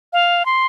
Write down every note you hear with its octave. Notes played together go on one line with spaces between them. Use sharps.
F5
C6